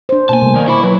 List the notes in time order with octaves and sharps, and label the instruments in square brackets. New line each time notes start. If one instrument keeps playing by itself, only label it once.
[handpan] D4 C5
[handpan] B2 A#3 [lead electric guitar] G#5 A5
[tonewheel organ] C3 G3 A3
[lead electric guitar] D#3 [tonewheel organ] D5 F5 G#5
[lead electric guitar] E4 B5 [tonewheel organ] C5 C#6 D6
[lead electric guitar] F#3 [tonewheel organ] B4